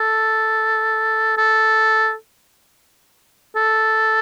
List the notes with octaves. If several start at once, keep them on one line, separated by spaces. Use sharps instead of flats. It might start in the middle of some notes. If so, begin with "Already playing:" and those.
Already playing: A4
A4
A4